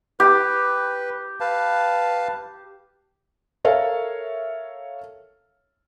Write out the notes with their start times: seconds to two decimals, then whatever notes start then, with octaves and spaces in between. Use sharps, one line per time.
0.20 G4 B4
1.40 B4 F5 A5
3.65 A4 A#4 C#5 E5 F5